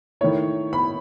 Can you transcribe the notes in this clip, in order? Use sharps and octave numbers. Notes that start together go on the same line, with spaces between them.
D#3 A3 E4 C#5
B5